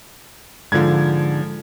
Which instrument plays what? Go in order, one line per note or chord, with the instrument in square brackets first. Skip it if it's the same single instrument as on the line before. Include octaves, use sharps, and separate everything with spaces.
[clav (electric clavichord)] G#2 D3 [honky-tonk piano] F3 G#6